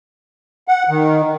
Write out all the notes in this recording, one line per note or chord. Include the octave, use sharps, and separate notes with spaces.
F#5
D#3